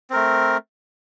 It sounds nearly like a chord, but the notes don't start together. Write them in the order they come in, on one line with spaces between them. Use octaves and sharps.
C4 A#4 A3